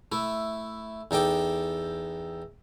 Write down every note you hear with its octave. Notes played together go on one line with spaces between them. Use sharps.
A3 E4
E2 D#4 A4 G5 D6